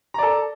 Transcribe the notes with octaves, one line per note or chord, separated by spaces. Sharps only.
A4 D5 A#5